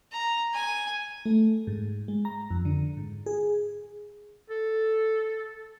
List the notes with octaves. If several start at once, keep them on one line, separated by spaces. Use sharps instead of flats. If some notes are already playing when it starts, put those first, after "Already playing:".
A#5
G#5
A3
G#2
G#3
A#5
F2
D3
G#2
G#4
A4